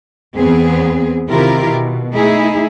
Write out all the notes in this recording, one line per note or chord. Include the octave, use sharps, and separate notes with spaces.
E2 B3 C4 G#4
C3 D#3 E4 F4 G4 A#4
B2
A3 D#4 E4 G#4